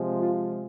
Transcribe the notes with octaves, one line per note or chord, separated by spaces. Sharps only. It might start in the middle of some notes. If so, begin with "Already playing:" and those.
Already playing: C3 F3 G#3
F4